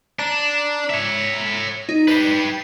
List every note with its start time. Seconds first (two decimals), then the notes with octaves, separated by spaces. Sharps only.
0.19 D4 A#5
0.90 C#5 E5
1.89 D#4
2.08 G4 B4 A6 C7